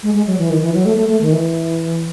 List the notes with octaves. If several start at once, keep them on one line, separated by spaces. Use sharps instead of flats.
G#3
G#3
F#3
E3
D#3
E3
F#3
A3
A3
A3
D#3
E3